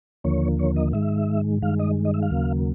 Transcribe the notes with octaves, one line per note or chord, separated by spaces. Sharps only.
D#2 D3 F3 A#3 C#5
C#5
D#5
G#2 D#3 G#3 E5
G2 D#3 G#3 F5
D#5
D#5
E5
F5
D#2 C#3 F#3 A#3